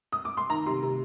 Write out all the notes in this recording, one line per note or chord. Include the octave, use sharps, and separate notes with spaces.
D#6
D6
C6
D#3 A#5
C3 C6
C3